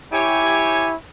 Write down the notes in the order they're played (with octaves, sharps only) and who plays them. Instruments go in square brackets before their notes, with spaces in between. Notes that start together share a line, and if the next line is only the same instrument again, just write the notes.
[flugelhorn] E4 [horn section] G4 C#5 G#5